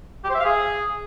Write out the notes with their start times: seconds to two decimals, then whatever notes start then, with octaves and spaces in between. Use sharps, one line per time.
0.24 G4
0.29 C5
0.34 E5
0.40 F5
0.45 G#4